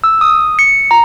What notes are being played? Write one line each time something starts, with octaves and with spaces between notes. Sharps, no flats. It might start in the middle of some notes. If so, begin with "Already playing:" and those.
E6
D#6
C#7
A#5